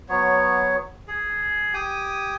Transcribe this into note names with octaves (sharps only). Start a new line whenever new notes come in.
F#3 B3 C#5
G#4
G4 G5 G#5 D#6